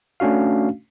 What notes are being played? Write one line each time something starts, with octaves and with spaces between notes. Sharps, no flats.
A3 C#4 D4 F#4 F5